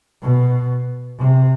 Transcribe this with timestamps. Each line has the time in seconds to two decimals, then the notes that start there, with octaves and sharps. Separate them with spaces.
0.22 B2
1.19 C3